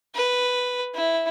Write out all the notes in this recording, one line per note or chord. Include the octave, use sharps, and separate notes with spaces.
B4
E4